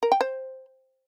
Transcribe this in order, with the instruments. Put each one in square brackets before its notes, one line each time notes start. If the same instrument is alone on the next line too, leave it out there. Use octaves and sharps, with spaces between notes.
[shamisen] A#4
G5
C5